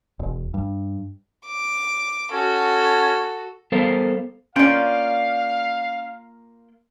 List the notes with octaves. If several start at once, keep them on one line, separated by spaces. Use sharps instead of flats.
E1
G2
D6
C#4 F#4 A4
G3 B3 A4 A#4 C5 F5
A#3 C#4 F4 D5 F5 G5